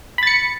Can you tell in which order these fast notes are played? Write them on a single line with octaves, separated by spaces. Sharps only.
B5 A6 C#7